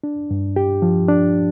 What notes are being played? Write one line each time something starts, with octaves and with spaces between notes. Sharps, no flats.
D4
G2
G4
F3
D4